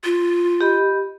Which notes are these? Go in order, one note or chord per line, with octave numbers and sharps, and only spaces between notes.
F4
G4 D#5 B5